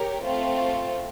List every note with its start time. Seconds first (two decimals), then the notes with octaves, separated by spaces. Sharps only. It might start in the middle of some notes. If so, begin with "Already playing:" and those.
Already playing: G4 A#4 C#5
0.26 A3 C4 F4